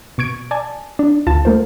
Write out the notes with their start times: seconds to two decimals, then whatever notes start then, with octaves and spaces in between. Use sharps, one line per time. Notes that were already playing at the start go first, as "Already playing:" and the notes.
0.18 B2 C#6 G#6 D7
0.51 D5 G#5 A5
0.99 D4
1.27 D2 F4 A5
1.45 A3 A#3 C5